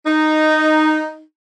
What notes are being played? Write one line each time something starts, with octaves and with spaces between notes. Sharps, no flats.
D#4